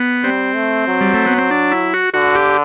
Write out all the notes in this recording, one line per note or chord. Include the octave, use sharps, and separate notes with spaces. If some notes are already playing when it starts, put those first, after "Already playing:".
Already playing: B3
G3 C4
A3
F#3
G3
A3
B3
C4
D4
E4
F#4
D3 F#4
G4